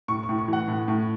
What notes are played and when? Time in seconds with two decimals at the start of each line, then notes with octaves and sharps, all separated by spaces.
0.08 A2 C#6
0.23 C#6
0.29 A2
0.38 C#6
0.48 E3 F#5
0.68 A2
0.88 A2